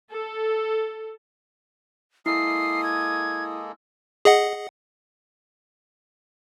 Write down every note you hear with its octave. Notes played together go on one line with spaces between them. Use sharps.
A4
G#3 A#3 E4 A4 D#6 C7
G#6
G#4 D#5 F#5